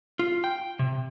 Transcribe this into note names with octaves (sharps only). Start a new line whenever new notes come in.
F4
G5
C3